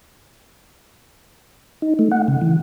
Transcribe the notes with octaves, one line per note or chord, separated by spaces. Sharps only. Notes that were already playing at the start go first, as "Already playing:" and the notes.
D#4
A3
F#5
C#3
E3